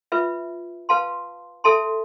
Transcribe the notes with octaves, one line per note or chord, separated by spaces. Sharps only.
F4 B4 E5
B4 F5 A5 C6
A4 E5 A5 C6